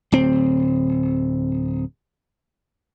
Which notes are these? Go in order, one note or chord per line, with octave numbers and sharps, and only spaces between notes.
D1 C4